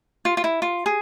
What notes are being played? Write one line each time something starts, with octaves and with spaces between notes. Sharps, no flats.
F4
F4
E4
F4
G#4